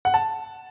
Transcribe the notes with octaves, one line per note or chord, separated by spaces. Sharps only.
F#5
A5